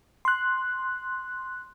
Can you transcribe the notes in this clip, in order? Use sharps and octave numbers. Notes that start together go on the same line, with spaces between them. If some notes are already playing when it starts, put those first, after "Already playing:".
C6 F#6